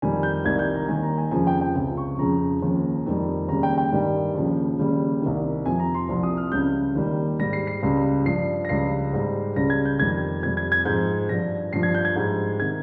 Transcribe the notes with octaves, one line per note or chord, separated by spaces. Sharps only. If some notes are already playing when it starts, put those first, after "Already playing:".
F2 D#3 G3 G#5
G6
C2 C3 D#3 G3 G#6
G6
A#5
D#2 D#3 G3 G#5
A#5
G#5
F2 C#3 F3 G#5
G5
G5
C#2 C3 F3
C#6
F2 C#3 F3 A#5
D#2 C#3 F3
F2 D#3 G3
D#2 C#3 G3 A#5
G5
G5
G2 D#3 G3
D#2 C#3 F3
D#2 C#3 G3
C2 C3 D#3
F2 C3 F3 G#5
A#5
C6
C2 C3 F3 C6
D#6
F6
C#2 C#3 G3 G6
D#2 D#3 G3
G#2 G3 A#6
C7
C7
C#2 C#3 G3
G2 F3 C7
A#6
C#2 C#3 G3 C7
G#2 G3
C#2 C#3 G3 A#6
G#6
G6
F2 D#3 G3 G#6
F2 C3 G3 G#6
G#6
G#6
G#2 F3 G6
G2 F3 A#6
G2 F3 C7
G#6
G6
G#6
G#2 G3
C3 D#3 G#6